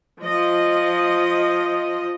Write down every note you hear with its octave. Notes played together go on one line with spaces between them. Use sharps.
F3 D#5